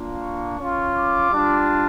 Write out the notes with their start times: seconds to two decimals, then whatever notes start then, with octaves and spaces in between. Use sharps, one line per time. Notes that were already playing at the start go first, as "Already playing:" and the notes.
Already playing: A#3 D4 F4
0.22 C#6
0.58 C#4 F4
0.94 D6
1.30 G3 D4 F4